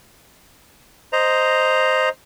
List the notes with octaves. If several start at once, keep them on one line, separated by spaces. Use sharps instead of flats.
C5 D#5 A#5